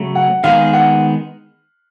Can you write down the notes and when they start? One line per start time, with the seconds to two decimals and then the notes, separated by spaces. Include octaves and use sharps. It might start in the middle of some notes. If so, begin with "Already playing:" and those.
Already playing: C#3 F#3 A3
0.15 F#5
0.44 D#3 G#3 B3 D#4 G#4 F5
0.73 F#5